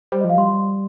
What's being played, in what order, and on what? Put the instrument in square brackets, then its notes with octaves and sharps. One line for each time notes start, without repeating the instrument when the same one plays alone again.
[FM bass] G3 [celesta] C5
[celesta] D#5
[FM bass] F3
[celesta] F5
[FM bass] G3 [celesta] C6